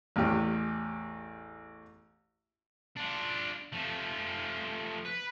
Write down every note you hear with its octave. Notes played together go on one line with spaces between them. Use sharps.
A1 E2 A2 G4
D4 F4
F3 A3
B4